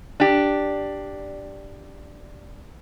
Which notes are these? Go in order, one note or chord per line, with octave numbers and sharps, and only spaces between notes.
D4 G4